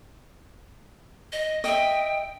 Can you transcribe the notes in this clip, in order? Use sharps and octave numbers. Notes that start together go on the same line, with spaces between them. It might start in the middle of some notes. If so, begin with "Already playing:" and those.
D#5
D#5 E5 G5